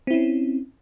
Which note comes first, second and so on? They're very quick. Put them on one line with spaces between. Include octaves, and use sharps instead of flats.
C4 E4 C#4